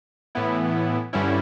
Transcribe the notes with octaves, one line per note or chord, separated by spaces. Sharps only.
A2 E3 B3 E4
G2 D3 G3 C#4 E4